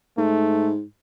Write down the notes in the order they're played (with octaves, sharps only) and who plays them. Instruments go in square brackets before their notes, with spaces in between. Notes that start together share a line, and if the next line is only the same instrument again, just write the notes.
[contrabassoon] G#2 [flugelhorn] A3